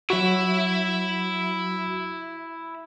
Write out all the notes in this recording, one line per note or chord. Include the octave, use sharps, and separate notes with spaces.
F#3 E4 F#4 E5